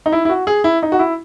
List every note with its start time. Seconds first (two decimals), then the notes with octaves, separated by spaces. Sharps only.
0.06 D#4
0.12 E4
0.25 E4
0.29 F#4
0.47 G#4
0.64 E4
0.83 D#4
0.92 F#4
0.99 E4